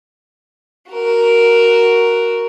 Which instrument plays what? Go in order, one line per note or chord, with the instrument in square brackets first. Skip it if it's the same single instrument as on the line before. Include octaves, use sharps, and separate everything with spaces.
[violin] F#4 A#4